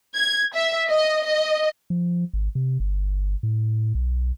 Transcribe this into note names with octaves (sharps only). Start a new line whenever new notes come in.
G#6
E5
D#5
D#5
F3
G#1
C3
G1
A2
B1